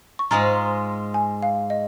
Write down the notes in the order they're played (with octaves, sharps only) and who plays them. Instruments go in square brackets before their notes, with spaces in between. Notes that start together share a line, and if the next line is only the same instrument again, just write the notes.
[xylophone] C#6
[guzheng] G#2 G#3 F4 [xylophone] A#5
[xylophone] G#5
F5
D#5